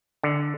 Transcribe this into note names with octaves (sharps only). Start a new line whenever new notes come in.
D3